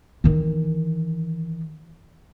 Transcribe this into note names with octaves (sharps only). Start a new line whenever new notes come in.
D#3 E3